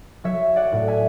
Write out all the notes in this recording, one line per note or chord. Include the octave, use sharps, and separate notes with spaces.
F#3 C#5 E5
D5 F#5
A2
E5 G#5